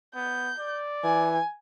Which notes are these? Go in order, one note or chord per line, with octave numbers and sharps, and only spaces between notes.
B3 G6
D5
E3 G#5